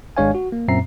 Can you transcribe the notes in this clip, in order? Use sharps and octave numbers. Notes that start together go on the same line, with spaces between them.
G#1 G#3 D4 C#5 F5 G#5
F#4
A#3
F#2 A#2 C4 E5 A#5 C7